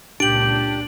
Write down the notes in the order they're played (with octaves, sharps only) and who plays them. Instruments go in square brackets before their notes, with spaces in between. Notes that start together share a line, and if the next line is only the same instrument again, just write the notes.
[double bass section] C#2 A#2 [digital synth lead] D4 [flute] G4 [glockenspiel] D7 F#7